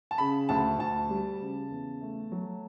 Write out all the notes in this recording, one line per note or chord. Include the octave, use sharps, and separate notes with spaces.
A5
C#3 B5
D2 A5
D2 A5
G3
C#3
E2
A3
F#3